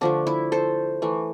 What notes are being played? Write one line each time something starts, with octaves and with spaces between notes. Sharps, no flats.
D3 F3 A3 D4
E4
A4 C5
E3 A3